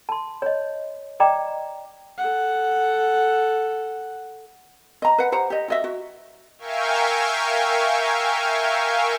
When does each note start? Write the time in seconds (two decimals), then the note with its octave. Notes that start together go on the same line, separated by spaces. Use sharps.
0.09 A5 C6
0.42 C#5 D#5
1.20 D5 D#5 G5 A#5 D6
2.18 A4 F#5
5.02 D#5 A#5
5.18 B4 F#5
5.32 G4 C5 F#5 A#5
5.50 G4 D#5
5.68 F#4 D#5 E5
5.84 F#4
6.59 A#4 E5 F5 G5 G#5 C#6